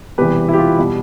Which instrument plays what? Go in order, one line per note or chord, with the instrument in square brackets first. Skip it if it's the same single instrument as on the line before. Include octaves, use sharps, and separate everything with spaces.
[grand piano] E1 E2 C3 E3 G3 G4 B4
E4
G4
F4
B2 G3